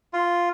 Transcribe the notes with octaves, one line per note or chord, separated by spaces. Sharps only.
F4